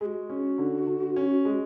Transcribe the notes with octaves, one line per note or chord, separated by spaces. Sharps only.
G#3 F#4 G#4
C#4
D3
D3
C#4
G#3